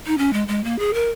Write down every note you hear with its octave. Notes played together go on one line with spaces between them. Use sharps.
D#4
C#4
G#3
G#3
A#3
G#4
A#4